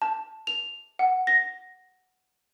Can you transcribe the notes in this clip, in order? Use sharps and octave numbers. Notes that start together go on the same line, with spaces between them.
A5
F7
F#5
A#6